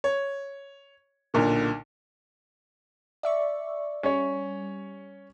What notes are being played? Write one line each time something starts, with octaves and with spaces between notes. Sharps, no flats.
C#5
B1 A#2 D3
D5 E5 C#6
G3 C#4 C#5